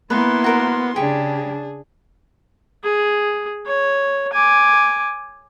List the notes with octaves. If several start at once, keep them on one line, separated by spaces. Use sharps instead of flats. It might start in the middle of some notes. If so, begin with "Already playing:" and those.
A#3 B3 E4 B4 C6
F#4 A#4 C5
C#3 D4 G4 G#4
G#4
C#5
G#5 D6